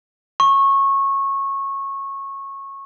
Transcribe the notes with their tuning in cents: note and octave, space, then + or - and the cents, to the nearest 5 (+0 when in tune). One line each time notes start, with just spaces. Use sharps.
C#6 -20